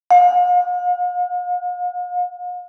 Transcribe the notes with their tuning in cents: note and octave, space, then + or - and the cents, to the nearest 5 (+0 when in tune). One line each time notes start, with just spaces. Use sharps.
F5 +45